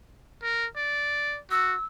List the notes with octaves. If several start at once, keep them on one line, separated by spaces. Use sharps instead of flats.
A#4
D5
F#4 E6